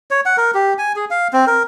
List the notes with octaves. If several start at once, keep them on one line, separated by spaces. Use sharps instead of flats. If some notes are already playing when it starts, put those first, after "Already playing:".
C#5
F#5
A#4
G4
G#5
G#4
F5
C4
A#4